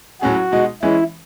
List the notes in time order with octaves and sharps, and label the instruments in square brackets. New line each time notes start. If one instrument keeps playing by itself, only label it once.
[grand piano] A2 F#3 C#4 G#4 [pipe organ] F#4
[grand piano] B2 G#3 D#4
[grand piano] E3 G#3 C#4 [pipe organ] E4